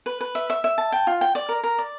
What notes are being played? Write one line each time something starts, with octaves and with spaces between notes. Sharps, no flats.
B4
B4
E5
E5
E5
A5
G5
F4
G5
D5
A#4
A#4
D5